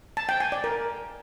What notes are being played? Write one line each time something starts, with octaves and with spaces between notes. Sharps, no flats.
A5
G5
G#5
D5
A#4